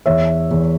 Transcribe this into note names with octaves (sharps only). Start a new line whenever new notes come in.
E2 C#5 E5
E2